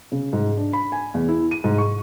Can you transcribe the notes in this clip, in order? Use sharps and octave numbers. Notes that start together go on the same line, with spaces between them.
C#3
G#2
D4
B5
G#5
E2
E4
D#7
G#2
C#6